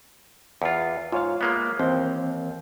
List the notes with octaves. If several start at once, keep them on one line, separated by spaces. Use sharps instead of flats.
E2 F4
G#2 F4 C#5 F5
G#3 A#3 B3
D#2 E3 C4 G6